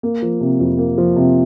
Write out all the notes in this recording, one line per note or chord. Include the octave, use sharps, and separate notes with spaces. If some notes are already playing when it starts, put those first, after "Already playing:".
A#3
F3
C3
F2
A#3
F3
C3